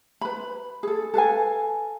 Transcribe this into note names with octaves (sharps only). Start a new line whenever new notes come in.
B4 B5
G#4 A4
A4 B4 F5 G#5